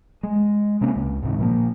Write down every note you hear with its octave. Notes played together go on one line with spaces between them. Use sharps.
G#3
C3 A#3 C4 C#4
C#2 C#3
G#2 C3 D#3
A#2 F3 A#3